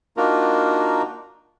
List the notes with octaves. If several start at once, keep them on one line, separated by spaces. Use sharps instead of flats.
A#3 D4 D#4 F4 F#4 A#4